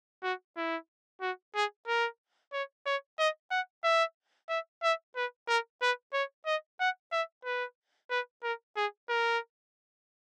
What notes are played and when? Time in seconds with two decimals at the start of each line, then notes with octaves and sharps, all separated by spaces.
0.23 F#4
0.57 E4
1.21 F#4
1.55 G#4
1.87 A#4
2.53 C#5
2.86 C#5
3.19 D#5
3.51 F#5
3.84 E5
4.49 E5
4.83 E5
5.16 B4
5.48 A#4
5.82 B4
6.13 C#5
6.46 D#5
6.80 F#5
7.12 E5
7.45 B4
8.10 B4
8.43 A#4
8.76 G#4
9.09 A#4